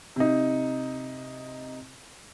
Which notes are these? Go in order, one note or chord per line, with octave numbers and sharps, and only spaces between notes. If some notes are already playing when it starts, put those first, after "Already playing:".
C3 D#4